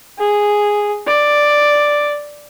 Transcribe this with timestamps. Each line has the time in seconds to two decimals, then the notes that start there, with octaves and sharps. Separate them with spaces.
0.19 G#4
1.07 D5